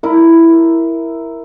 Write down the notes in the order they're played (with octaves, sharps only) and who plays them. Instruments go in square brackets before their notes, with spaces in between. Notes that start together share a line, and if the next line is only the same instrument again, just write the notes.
[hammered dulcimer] E4 A#4